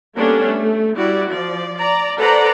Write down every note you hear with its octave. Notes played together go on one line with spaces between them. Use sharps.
G3 A#3 B3 C#4 D4 A4
A3
G3 E4 F#4 D5
F3 D5
D5 A#5
A4 B4 C5 D5 F#5 A#5